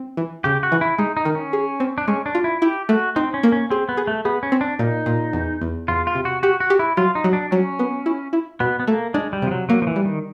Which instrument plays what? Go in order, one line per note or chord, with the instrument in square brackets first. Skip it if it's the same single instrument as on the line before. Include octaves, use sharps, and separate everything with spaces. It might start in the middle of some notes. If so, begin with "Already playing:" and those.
Already playing: [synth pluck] C4
E3
[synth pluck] C#3 [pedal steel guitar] G4
[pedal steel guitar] F#4
[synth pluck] E3
[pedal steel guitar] E4
[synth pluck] G#3 [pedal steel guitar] D#4
[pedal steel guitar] D#4
[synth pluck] D#3
[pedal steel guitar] C#4
[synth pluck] G#4
C4
[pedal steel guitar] D4
[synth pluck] G#3 [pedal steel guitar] C#4
[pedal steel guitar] D4
[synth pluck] F4
[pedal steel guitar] E4
[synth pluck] E4 [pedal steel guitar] G4
[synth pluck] A3 [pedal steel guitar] F#4
[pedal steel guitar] C4 [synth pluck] D#4
[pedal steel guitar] C#4
[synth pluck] A#3
[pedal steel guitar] C#4
[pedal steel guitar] C4 [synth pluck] G#4
[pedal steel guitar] B3
[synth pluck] G#4
[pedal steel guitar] A3
[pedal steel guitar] B3 [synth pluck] G#4
[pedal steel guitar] C#4
[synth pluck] C4
[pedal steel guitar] D4
[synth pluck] A#2 [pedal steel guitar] D#4
[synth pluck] A#2
E2
E2
[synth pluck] E2 [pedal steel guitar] F4
[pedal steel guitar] F4
[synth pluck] C3
[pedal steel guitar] F#4
[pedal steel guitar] F#4 [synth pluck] G4
[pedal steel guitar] F#4
[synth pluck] G4
[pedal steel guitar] E4
[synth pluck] F#3 [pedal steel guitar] F4
[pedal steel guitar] D#4
[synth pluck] F#3
[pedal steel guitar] D4
[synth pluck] F#3 [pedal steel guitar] C#4
[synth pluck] B3
E4
E4
[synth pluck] B2 [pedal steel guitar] B3
[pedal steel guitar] B3
[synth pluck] A3 [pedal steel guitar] A#3
[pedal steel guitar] G#3 [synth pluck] D4
[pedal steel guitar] G3
[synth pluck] C3 [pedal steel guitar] F3
[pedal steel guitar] F#3
[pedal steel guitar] F#3 [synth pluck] A#3
[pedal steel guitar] F3
E3
[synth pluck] G3
[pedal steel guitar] D#3